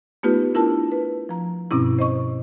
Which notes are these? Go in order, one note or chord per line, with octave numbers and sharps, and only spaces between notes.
A3 B3 D#4 F4 G4 B4
D4 E4 F4 A#4 A5
B4
F3 A#5
G2 B2 C4 C#4 E4
C5 D#5 C#6